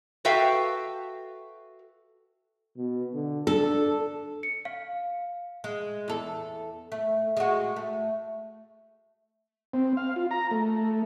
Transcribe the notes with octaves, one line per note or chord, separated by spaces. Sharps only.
F#4 A4 B4 E5 F5 G5
B2
D3
D4 A4
C#7
F5
G#3
E2 A4
A3
G#3 F#4
A3
C4
F5
F4
A#5
A3